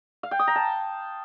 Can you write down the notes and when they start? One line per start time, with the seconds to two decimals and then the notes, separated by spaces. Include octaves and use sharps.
0.23 F5
0.31 G5
0.39 D#6
0.47 A#5
0.55 A5